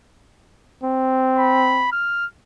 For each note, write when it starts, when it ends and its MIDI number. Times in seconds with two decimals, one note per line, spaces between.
0.83 1.89 60
1.38 1.92 83
1.92 2.26 89